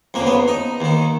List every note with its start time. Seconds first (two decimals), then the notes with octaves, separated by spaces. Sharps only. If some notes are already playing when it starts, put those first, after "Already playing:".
0.14 F2 A#3
0.19 C#3
0.26 B3
0.48 D#4
0.80 D#2 D#3